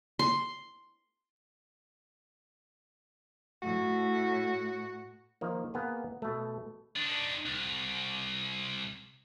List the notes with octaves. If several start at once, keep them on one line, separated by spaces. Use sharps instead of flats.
C6
A2 F#4
D#3 F3 A#3
A#3 B3 G#4
B2 A3
D#3 D4
C2